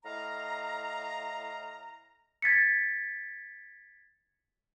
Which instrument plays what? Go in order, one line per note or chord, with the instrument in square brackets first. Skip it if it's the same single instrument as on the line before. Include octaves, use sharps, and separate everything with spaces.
[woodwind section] A2 D#5 F5 A#5
[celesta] G#6 A6 B6 C#7